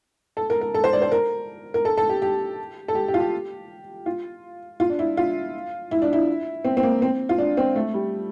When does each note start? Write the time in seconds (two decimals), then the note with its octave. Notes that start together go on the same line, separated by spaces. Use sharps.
0.37 A4
0.50 A#4
0.61 A#4
0.74 A4
0.84 C5
0.93 D5
1.02 C5
1.12 A#4
1.74 A#4
1.85 A4
1.97 A4
2.09 G4
2.22 G4
2.88 A4
2.95 G4
3.08 G4
3.14 F4
3.20 G4
4.06 F4
4.80 F4
4.90 D4
4.99 E4
5.17 F4
5.91 E4
6.02 D4
6.13 E4
6.65 C4
6.77 C4
6.83 A#3
7.02 C4
7.29 F4
7.38 D4
7.57 C4
7.76 A3
7.94 G3